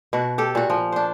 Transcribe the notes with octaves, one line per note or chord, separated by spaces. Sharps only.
B2 F#4
G4 A4
A#2 F#4
F3
D4 C5